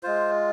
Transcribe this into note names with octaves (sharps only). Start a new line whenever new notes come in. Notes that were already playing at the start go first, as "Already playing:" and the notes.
G#3 F4 C5